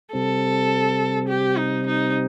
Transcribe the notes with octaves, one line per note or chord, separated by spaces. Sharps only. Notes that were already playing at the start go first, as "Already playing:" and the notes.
C3 G3 C4 A4
G4
D#4
D#4